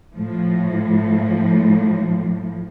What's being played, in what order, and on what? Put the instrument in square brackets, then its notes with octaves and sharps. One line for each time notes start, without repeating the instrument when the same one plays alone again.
[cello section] A2 F3